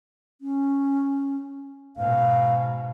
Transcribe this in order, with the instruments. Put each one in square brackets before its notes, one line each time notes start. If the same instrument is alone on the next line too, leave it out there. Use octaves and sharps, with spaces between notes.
[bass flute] C#4
[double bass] G#2 B2 [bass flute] F5